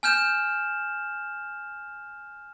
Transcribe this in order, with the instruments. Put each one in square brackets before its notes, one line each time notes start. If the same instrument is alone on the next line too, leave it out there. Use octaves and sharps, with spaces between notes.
[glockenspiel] G#5 F6 G6 E7